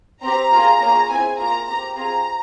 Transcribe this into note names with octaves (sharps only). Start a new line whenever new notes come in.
C4 G4 A#5
A#3 F4 G#4
A#3 C#4 F4 G#4
C4 E4 G#4 G#5
A#3 F4 G#4 A#5
C4 G4 A#5
C4 F4 G#4 A#5